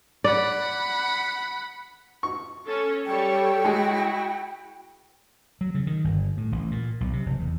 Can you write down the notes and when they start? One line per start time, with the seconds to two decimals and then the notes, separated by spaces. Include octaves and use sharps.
0.24 D5 F#5 B5
2.23 C#6
2.65 C#4 A4
3.06 G3 A4 C#5 G5
3.65 G#3 E4 F#4
5.61 F#3
5.75 C#3
5.87 D#3
6.04 G1
6.37 A2
6.52 A1
6.71 A#2
7.01 B1
7.13 C3
7.26 F1
7.40 E2